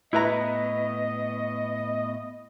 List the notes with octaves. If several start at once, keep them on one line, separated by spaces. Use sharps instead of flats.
A2 B3 E4 B4 D#5 A#5